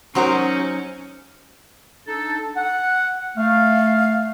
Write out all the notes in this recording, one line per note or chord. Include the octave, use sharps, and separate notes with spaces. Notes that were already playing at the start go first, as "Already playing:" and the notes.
F#3 C#4 D#4 F#4 A#4 C5 C6
D4 D#4 A4
F#5
A3 F5